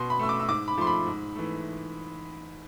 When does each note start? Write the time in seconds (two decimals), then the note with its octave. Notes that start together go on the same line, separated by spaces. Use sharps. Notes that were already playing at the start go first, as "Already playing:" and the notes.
Already playing: B2 C6
0.10 B5
0.19 A3 E6
0.29 D6
0.40 E6
0.48 G#2 D6
0.68 B5
0.78 F3 A3 C6
0.87 B5
1.06 G#2
1.36 E3 A3